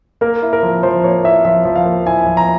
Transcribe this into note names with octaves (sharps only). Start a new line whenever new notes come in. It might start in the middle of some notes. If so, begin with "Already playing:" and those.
A#3 A#4
E4
A#4
F3
F3 C5
A#3 C#5
E4 E5
F3 E5
F3
F5
A#3
E4 G#5
F3
A#5